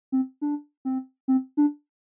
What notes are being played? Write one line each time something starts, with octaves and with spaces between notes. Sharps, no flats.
C4
D4
C4
C4
D4